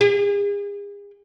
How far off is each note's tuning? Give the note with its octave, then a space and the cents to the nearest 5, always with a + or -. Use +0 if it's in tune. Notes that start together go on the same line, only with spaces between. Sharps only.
G#4 -40